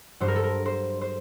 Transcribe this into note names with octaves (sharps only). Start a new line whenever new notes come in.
G2 F#3 C5
A#4
A4
A#4
C5
C5